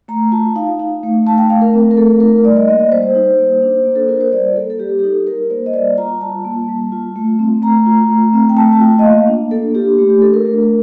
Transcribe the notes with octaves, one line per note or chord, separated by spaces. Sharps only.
A3 A#5
F4 A5
D#4 F5
D#4
A3
A3 A5
G5
A3 F5
A#4
C4
A#4
A3 A4
D#4 A#4
G3 D5
D#5
A#3 D#5
D5
G3 C5
D#4
A#3
D4
A#3
A4
F4 A#4
C5
G3 D5
A#3 A4
A4
G3 G4
G4
D#4 A4
G3 A#4
A#3 C5
D#5
G3 D5
F4 A#5
G3 A5
A#3
G3
F4
A3
C4
A3 A#5
F4
A3
C4
G5
A3 A5
A5
F4 G5
D#5
A#3 F5
D4
A#3 A4
F4 G4
A3 G4
G4
D4 A4
A#4
A3 A#4